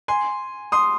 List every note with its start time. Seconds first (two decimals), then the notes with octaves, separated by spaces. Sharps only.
0.08 G#5 C6
0.72 C6 D#6